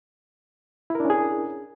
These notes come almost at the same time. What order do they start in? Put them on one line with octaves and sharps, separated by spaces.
E4 A#4 D4 C#4 G#4